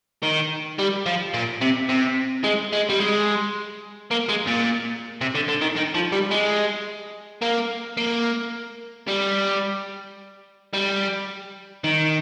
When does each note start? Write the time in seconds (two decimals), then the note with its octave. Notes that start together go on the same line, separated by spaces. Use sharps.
0.23 D#3
0.79 G3
1.06 F3
1.34 A#2
1.61 C3
1.89 C3
2.44 G#3
2.72 G#3
2.89 G3
3.00 G#3
4.11 A#3
4.29 G#3
4.47 A#2
5.21 C3
5.35 D3
5.49 D3
5.62 D#3
5.76 D#3
5.95 F3
6.12 G3
6.31 G#3
7.42 A#3
7.97 A#3
9.08 G3
10.73 G3
11.84 D#3